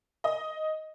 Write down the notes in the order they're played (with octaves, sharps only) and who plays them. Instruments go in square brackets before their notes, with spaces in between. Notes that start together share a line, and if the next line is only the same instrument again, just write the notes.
[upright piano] D#5